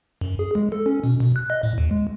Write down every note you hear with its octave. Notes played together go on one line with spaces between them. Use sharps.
F#2
G#4
G#3
A4
C#4
B2
B2
F#6
D#5
A2
D#2
G#3